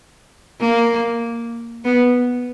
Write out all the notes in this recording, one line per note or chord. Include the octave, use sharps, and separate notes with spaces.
A#3
B3